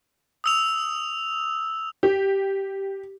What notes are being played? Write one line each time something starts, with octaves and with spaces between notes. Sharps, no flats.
D#6 E6 F7
G4